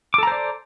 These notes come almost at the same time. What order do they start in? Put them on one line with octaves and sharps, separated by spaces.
D6 A4 A#5 C5 D5